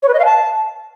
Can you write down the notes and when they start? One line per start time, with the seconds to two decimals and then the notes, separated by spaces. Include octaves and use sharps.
0.02 C#5
0.08 B4
0.14 D#5
0.19 F5
0.25 A5